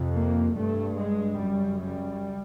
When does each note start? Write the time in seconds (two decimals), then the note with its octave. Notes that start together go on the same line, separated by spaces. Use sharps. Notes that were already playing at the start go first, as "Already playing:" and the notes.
Already playing: F2 C3
0.14 A#3
0.55 G2 A3
0.97 G#3
1.38 F#2 C#3 G3
1.80 G3